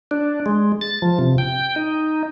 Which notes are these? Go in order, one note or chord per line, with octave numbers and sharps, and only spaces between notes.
D4
G#3
A6
F3
C3
G5
D#4